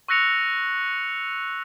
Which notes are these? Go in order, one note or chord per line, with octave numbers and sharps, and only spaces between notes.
C#6 E6 F#6 A#6 C#7 F7